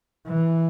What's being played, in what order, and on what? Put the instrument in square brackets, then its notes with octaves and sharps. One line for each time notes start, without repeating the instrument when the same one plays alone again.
[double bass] E3